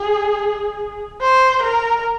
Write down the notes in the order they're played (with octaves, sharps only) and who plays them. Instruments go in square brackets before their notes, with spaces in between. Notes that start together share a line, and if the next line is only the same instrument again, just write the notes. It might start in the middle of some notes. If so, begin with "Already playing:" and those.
Already playing: [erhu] G#4
C5
A#4